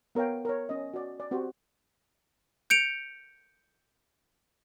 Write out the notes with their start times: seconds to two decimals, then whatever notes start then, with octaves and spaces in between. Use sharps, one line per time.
0.15 B3 A#4 C#5 F5 G5
0.45 A#4 C#5
0.69 C#4 D#5
0.94 F#4 D5
1.20 D5
1.31 C4 F#4 G4 C5
2.70 G6 C#7 D7 F7